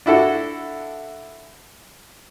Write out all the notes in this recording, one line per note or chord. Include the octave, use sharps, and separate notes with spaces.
D4 E4 F#4 A4